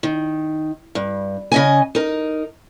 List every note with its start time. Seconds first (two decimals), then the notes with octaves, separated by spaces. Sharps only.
0.03 D#3
0.95 G2
1.52 C#3 D#5 G#5
1.95 D#4 A#4